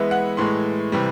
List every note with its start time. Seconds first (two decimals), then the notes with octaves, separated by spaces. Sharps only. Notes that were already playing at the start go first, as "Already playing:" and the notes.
Already playing: E3 G#3 B3 E5
0.11 F#5
0.37 A2 E3 G#3 C6
0.92 C3 E3 G3